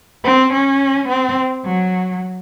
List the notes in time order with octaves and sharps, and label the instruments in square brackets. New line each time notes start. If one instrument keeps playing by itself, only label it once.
[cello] C4
C#4
C4
F#3